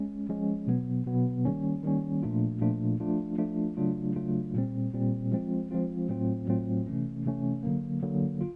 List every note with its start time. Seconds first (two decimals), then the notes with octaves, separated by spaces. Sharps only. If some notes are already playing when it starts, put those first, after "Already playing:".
Already playing: G#3 C#4
0.29 F3 G#3 C#4
0.67 B2 F#3 B3
1.06 B2 F#3 B3
1.45 D#3 G3 A#3 C#4
1.83 D#3 G3 A#3 C#4
2.23 A#2 F3 A3 D4 F4
2.61 A#2 F3 A3 D4 F4
3.00 F3 A3 D4 F4
3.38 F3 A3 D4 F4
3.77 C#3 F#3 A3 D4 F4
4.15 C#3 F#3 A3 D4 F4
4.55 A#2 G3 C4
4.93 A#2 G3 C4
5.32 F3 G#3 C4 F4
5.71 F3 G#3 C4 F4
6.09 A2 F#3 A3 C4 F4
6.48 A2 F#3 A3 C4 F4
6.86 C3 E3 A3 C#4
7.26 C3 E3 A3 C#4
7.63 D3 F#3 A#3
8.03 D3 F#3 A#3
8.41 F4